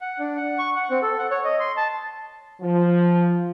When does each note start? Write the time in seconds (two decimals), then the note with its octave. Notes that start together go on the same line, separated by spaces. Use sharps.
0.01 F#5
0.19 D4
0.37 F#5
0.59 C#6
0.76 F#5
0.90 C4
1.02 A4
1.19 F#5
1.31 C#5
1.45 D#5
1.60 C6
1.77 A5
2.61 F3